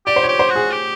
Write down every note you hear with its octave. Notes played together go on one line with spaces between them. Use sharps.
G4 D5
C5
C#5
G4
C5
F#4
G#4
G4